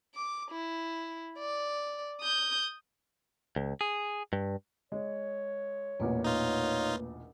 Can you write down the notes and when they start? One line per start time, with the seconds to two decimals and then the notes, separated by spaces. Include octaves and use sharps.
0.15 D6
0.51 E4
1.39 D5
2.21 D#6 G6
3.56 C#2
3.81 G#4
4.33 G2
4.92 G#3 C#5
6.00 E1 A1 A#2 A3 A#3 B4
6.24 D#4 F4 C#5